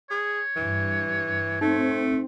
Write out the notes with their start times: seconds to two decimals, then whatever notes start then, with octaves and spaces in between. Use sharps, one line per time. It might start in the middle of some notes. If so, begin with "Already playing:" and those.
0.10 G#4 C#5
0.56 G2 E3
1.61 A3 C4 D#4